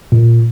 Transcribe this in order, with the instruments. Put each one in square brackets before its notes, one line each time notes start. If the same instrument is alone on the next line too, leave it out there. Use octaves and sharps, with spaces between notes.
[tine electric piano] A#2